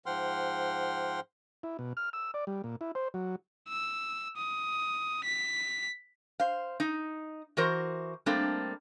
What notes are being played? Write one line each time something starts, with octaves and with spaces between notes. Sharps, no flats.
G#2 F3 F#5 G5 C6 F6
E4
B2
F6
E6
D5
G3
A#2
E4
C5
F#3
E6
D#6
B6
C5 F5
D#4
E3 F#4 A#4 C5
G3 A3 A#3 C4 D4 A4